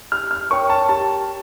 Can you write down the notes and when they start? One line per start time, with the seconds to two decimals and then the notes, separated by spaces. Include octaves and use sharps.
0.12 G4 F6
0.31 F6
0.51 A#4 C#5 G5 C#6
0.70 A5
0.89 G4 A5